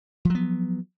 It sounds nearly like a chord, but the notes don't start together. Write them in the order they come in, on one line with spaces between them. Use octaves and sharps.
F3 F#3 B3